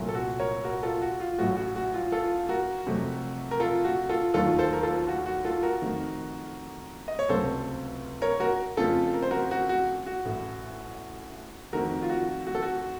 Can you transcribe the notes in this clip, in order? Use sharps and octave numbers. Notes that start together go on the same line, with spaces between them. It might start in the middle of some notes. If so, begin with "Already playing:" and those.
Already playing: C2 A#2 F#3 A3
A4
F#4
A#4 C#5
F#4 A#4
F4 A4
F#4
F4
A1 A2 F#3 A3 F#4
F#4
F#4
F4
F4 A4
F#4 A#4
F2 C3 F#3 A3
A#4
F4 A4
F#4
F4 A4
D#2 D#3 F#3 A3 F4 A4
A4 C5
A#4
F4 A4
F#4
F#4
F4 A4
F#4 A#4
F2 D#3 A3
D#5
C#5
C#2 C3 F#3 A3 A4 C5
A#4 C#5
F#4 A#4
F2 C#3 A3 F4 A4
A#4
C5
F#4 A#4
F#4
F#4
F#4
A1 A2 A3
F2 D#3 A3 F#4 A#4
F4
F#4
F#4
A4
F#4